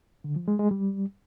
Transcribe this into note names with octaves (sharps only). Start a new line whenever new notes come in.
D3
F3
G#3
G#3
G3